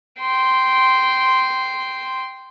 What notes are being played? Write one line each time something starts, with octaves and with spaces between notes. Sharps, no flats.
G5 C6